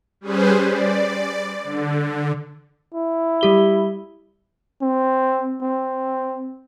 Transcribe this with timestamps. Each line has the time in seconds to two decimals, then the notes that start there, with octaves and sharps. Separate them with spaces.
0.21 G3 C#4 G#4 B4 C5
0.68 D5
1.64 D3
2.94 E4
3.41 G3 G4 G7
4.82 C4
5.62 C4